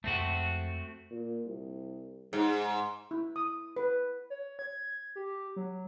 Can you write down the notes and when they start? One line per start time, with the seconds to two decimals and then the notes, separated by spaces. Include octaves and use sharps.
0.04 F2 G#3 A3 C4 F#4
1.11 A#2
1.46 C2
2.33 G#2 G#3
3.11 E4
3.36 D#6
3.76 B4
4.30 C#5
4.59 G#6
5.16 G4
5.56 F#3